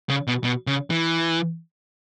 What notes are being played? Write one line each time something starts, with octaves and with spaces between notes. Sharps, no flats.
C#3
B2
B2
C#3
E3